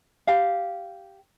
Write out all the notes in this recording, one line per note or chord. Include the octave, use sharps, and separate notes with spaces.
G4 F5